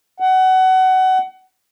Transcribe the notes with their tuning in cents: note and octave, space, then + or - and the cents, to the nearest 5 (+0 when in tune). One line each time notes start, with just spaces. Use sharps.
F#5 +25